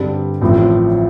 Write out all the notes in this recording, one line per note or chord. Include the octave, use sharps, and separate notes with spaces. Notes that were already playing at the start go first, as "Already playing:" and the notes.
Already playing: G2 D3 G3 C4 G4
A1 A2 F3 C4 F4